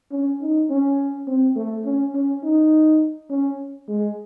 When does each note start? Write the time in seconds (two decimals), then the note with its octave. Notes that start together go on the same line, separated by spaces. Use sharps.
0.11 C#4
0.41 D#4
0.70 C#4
1.27 C4
1.56 A3
1.85 C#4
2.14 C#4
2.43 D#4
3.30 C#4
3.88 G#3